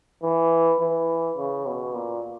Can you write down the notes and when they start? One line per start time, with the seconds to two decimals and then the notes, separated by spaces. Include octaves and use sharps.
0.23 E3
0.81 E3
1.38 C#3
1.67 B2
1.94 A#2